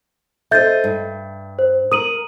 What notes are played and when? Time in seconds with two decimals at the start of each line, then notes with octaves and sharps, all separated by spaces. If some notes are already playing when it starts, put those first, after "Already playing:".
0.51 A4 C5 D#5 E5 G6 A6
0.84 G2
1.59 C5
1.92 A#4 D#6 D#7 F#7